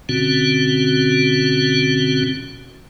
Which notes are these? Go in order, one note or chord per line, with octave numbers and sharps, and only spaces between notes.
B2 D3 C4 C#4 F#4